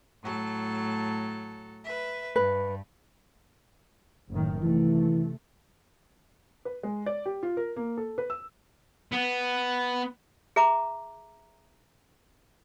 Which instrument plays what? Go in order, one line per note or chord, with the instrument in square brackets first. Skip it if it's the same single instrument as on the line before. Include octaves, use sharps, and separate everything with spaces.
[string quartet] A2 F#3 A4
B4 E5
[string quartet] G2 [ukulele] B4
[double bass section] F#1 A2 D#3
[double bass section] C3 A3 [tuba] E3
[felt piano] B4
G#3
D5
G4
F4
A#4
A#3
A4
B4
E6
[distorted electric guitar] B3
[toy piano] G#4 E5 A#5 D6